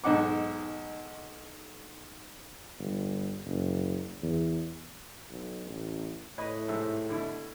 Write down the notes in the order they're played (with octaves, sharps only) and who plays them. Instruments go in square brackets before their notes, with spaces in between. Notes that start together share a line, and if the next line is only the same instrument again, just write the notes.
[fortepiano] B1 G#2 D#4 F#5 D6
[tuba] G1
F#1
E2
B1
A1
[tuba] A2 [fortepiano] B4 C#5 D#5
[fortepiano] G#2 C3 E5
B2 D3 E4